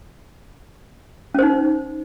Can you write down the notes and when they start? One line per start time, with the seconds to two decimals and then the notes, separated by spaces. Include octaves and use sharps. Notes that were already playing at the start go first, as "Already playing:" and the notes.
1.34 C#4
1.39 C5
1.43 D#4